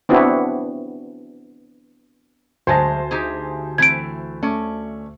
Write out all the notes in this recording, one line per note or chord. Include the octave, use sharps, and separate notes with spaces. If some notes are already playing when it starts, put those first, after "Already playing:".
B3 C4 D4 E4 F#4
D2 F#3 G#3 C5 G#5 A5 A#6
D#4 G4 G#4
E3 A3 C4 G#6 D7
A3 C#4 D5